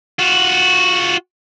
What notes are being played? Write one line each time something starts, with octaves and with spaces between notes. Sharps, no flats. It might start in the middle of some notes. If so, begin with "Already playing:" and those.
F4 F#4